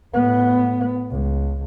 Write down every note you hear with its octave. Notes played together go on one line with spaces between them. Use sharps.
A2 B3
C#2